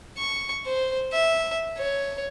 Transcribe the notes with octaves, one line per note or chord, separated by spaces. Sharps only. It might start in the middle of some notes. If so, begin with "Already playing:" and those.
C#6
C5
E5
C#5